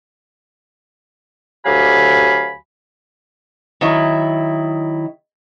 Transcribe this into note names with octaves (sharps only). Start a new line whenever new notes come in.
D2 F#3 G4 F5 G#5 B5
D#3 F#3 E4